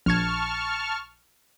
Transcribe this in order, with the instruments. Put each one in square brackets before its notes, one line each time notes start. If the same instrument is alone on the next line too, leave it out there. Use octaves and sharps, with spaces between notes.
[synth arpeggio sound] A#1 G#6 [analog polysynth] A5 C#6 F6